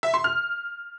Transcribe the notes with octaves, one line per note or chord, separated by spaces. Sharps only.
E5
C6
F6